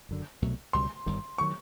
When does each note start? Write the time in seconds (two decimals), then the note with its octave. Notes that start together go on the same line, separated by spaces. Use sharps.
0.09 F#1 F#2 D3
0.42 C2 B2 F#3 A3
0.73 C#2 B2 G3 C6
1.06 G1 G2 D#3 G3
1.38 C#6
1.41 D#3 F#3